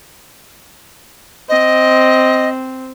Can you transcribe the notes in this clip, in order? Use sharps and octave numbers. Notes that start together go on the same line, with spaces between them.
C4 D#5